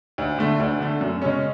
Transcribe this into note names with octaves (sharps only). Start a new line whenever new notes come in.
D2
D3 A3
D2
D3 A3
F#2
C#3 G#3 C#4